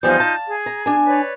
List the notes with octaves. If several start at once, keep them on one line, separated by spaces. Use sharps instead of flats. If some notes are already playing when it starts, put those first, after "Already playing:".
E2 F3 G3 D#4 F4 G6
F5 A5
G#4
A#5
D4 G#5
B4 C#5 D5